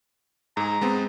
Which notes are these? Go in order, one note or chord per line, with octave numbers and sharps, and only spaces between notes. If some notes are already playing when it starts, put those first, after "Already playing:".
G#2 G#4 A#5
G#3 B3 C4